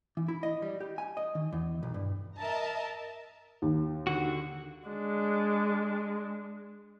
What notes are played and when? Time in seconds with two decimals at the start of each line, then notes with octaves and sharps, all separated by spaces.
0.17 E3
0.28 E4
0.43 D#5
0.62 G3
0.80 G4
0.98 G#5
1.17 D#5
1.35 D#3
1.53 E2
1.83 B1
1.94 G2
2.38 A#4 D#5 E5 A5 A#5
3.62 D#2
4.07 D3 F#4
4.88 G#3 D4